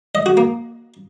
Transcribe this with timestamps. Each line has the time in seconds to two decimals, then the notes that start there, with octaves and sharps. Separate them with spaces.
0.15 D#5
0.26 F#4
0.37 A#3